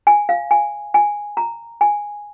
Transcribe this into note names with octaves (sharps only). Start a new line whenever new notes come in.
G#5
F5
G#5
G#5
A#5
G#5